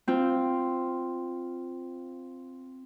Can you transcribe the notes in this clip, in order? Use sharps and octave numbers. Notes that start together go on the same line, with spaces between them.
C4 F4